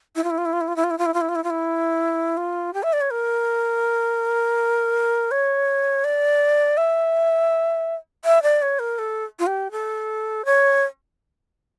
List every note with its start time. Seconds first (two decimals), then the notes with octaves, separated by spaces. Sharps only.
0.16 E4
0.24 F4
0.30 E4
0.38 F4
0.46 E4
0.53 F4
0.61 E4
0.68 F4
0.76 E4
0.84 F4
0.91 E4
0.98 F4
1.06 E4
1.14 F4
1.21 E4
1.29 F4
1.35 E4
1.44 F4
1.50 E4
2.37 F4
2.74 G4
2.83 E5
2.93 D5
3.01 C#5
3.11 A#4
5.31 C#5
6.04 D5
6.77 E5
8.25 E5
8.43 D5
8.62 C#5
8.79 A#4
8.99 A4
9.39 F4
9.47 G4
9.71 A4
10.45 C#5